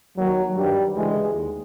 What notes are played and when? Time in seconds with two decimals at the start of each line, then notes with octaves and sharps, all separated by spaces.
0.17 D#2 D#3 F#3
0.56 G2 D#3 G3
0.95 D2 C#3 E3 G#3
1.34 D#2